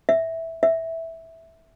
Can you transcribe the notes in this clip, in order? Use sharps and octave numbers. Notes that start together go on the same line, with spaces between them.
E5
E5